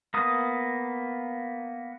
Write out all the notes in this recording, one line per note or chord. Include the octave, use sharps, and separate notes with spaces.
A#3 B3 D#6